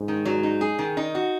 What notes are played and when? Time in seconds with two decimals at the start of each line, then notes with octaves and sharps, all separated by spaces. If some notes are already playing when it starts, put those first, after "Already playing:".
Already playing: G#2
0.08 D#3
0.25 F#3
0.43 D#4
0.61 G#4
0.79 D#3
0.97 D#4
1.15 F#4